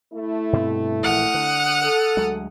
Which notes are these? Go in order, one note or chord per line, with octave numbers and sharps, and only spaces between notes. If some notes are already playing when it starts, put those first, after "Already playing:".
A3 E4
G2 B2 C4
A#1 E3 F#5 D#6 F6
D3
A4
D2 F#3 G#3